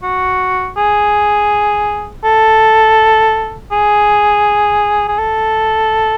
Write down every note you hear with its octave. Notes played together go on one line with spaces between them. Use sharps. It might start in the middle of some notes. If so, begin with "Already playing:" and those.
F#4
G#4
A4
G#4
G#4
A4